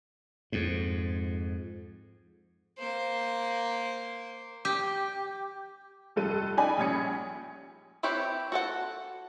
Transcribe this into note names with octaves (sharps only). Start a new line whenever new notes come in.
F2 G#2
A#3 C5
G4
F1 G2 A4 D#7
D#4 D5 G5 G#5 B5
A#1 G3 C#4 D#6 G#6 C#7
C4 E4 G4 B4 C#5
F#4 A4 F#5